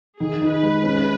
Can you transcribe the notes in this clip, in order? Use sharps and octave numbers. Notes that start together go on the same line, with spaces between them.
D#3 G#4
D#4
B4
G#3
C#4